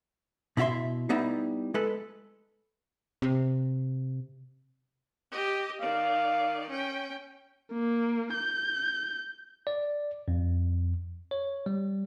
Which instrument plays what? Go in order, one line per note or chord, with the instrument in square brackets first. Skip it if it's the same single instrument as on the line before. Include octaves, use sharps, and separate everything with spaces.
[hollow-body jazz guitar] B2 E4 F4 E5 C6
G3 B3 D#4 E4
G#3 A4 B4
[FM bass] C3
[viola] G4 D#5
[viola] D#3 D5 [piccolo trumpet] F5
[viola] C#4 G5
[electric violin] A#3
G6
[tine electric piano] D5
F2
C#5
G3